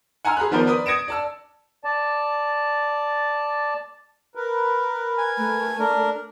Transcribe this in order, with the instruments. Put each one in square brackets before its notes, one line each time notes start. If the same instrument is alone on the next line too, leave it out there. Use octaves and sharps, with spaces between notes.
[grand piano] F#5 G#5 A#5 C6 E6 F6
G#4 A#5 B5 F#6
D#3 F3 B3 D4 A#4 C5
A#4 B4 D5 B5 D#6
D#6 G#6 A#6 C#7 D7 E7
D5 A5 E6
[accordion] D5 A5
[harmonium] A#4 B4
[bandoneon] G#5
[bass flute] A3
[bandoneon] D4 A#4